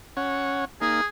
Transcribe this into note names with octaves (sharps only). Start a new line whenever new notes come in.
C#4 C#5 F#5
A#3 D#4 G#4